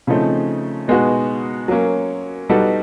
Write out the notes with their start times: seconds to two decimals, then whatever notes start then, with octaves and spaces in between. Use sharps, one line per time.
0.07 C#3 F3 A3 C4 D#4
0.88 B2 G#3 B3 D#4 F#4
1.68 F#3 A#3 C#4
2.49 G3 B3 D#4 F#4 A4